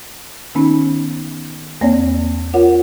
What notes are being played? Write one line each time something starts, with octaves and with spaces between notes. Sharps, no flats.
D#3 B3 C#4 D#4
E2 A#3 C4 C#5 D5
F4 A#4 C#5 F#5